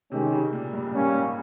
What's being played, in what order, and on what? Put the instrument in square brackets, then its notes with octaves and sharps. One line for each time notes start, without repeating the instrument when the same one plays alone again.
[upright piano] C3 [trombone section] D#3 G#3 C#4 G4
[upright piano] C#3
A#2
G2
G2
[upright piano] G#2 [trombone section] G3 A#3 C#4
[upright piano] A#2